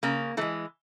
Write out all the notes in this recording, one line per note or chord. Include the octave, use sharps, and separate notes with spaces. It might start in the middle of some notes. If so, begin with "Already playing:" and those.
C#3 A#3
E3 G#3 A3